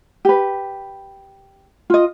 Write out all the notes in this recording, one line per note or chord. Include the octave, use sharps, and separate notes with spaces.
G4 B4
F4 D#5